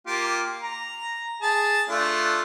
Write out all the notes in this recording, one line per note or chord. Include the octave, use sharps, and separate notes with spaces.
A#3 F4 G4
A#5
G#4 A5
A3 D4 F4